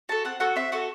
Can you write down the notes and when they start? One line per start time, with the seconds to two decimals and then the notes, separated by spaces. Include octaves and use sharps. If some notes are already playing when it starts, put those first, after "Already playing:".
0.09 F#4 A4 A5
0.25 C4 F#5
0.40 F#4 A4 F#5
0.56 C4 E5
0.72 F#4 A4 F#5